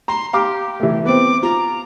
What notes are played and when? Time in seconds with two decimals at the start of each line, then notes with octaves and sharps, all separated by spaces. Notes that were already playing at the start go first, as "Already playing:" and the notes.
0.08 A#5 C6
0.33 G4 F5 A#5 D6
0.80 E3 A3
1.05 B3 C4 D6
1.43 F4 A#5